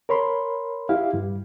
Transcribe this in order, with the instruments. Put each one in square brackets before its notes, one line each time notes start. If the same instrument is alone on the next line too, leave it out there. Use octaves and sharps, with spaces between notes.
[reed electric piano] A#4 C#5 B5 C6
E4 G4 F5
G2 G3